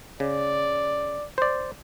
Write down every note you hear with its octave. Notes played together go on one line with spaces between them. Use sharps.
C#3 D5
C5 D5